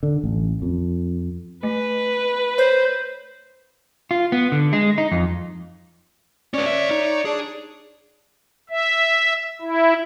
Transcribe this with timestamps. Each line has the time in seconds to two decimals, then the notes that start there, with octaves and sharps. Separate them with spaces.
0.03 D3
0.24 A1
0.62 F2
1.63 A3 B4
2.58 C5 C#5
4.11 F4
4.32 B3
4.52 D3
4.73 G#3
4.98 D#4
5.12 F2
6.54 C#4 B4 C#5 D5
6.65 D2 E5
6.91 D#4
7.25 D4 G#4
8.70 E5
9.61 E4